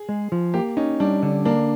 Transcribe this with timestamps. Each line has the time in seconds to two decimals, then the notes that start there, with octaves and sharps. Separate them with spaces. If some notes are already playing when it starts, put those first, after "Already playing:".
Already playing: G#4
0.09 G#3
0.32 F3
0.54 A#3 G4
0.77 C#4 D#4
1.00 G3 D4
1.23 D3
1.45 A#3 D4